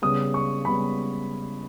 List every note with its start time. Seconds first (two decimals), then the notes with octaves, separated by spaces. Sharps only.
0.02 C#3 G3 B3 D#6
0.34 C#6
0.65 C#3 G3 B3 B5